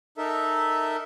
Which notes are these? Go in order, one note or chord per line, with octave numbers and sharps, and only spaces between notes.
D#4 A4 A#4 E5